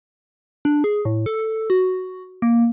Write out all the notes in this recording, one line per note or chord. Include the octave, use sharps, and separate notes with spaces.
D4
G#4
A2
A4
F#4
A#3